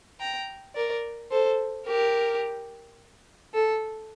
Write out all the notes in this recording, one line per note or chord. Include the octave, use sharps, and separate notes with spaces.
G5 A#5
A#4 D5
A4 C5
G4 A#4
A4